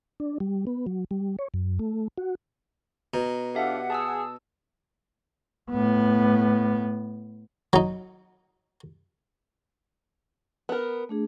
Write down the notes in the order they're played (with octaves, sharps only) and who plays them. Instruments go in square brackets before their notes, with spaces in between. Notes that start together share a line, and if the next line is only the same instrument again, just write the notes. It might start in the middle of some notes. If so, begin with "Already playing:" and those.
[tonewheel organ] D4
G3
B3
F#3
G3
C#5
F#2
A3
F#4
[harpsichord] B2 [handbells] A#5
[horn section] D4 F4 A4 [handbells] G4 E5 [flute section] F#5
[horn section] G#4 [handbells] A5 D#6 E6
[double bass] A2 B3
[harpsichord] F#3 D#4
[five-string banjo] B3 A#4
[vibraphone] A3 D4 G#4